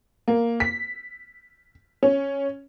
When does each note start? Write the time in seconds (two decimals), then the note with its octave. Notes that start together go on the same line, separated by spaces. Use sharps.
0.28 A#3
0.60 B6
2.03 C#4